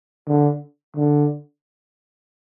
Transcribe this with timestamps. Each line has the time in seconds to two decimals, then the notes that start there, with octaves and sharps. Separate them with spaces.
0.27 D3
0.96 D3